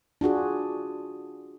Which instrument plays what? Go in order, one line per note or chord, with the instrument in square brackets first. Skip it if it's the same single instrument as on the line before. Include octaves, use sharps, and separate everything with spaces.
[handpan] D4 F4 F#4 G#4